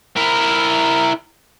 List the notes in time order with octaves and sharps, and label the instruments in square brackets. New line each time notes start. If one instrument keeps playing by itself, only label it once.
[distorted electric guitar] E4 A#4